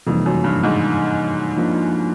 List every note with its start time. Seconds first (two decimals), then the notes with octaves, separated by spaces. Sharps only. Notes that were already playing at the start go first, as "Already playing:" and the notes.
0.07 F2 C3 E3 G3 A#3 D#4
0.26 F#2
0.44 G2
0.63 G#2
1.57 F3 A#3 D4 F4